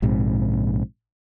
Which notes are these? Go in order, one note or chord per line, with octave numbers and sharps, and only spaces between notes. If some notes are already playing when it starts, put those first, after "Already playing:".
A#1 G#2 C3